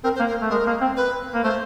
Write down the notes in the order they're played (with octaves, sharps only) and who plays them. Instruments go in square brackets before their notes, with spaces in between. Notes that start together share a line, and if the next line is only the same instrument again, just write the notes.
[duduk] C4 [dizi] A#4
[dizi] C5
[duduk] A#3
[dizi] A#4
[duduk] A3
[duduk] G#3 [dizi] A#4
[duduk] A#3
C4
[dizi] B4
[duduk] A#3
[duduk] A3 [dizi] C5